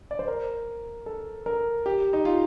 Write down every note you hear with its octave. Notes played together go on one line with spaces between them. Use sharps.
D5
C5
A#4
A4
A#4
G4
D#4
F4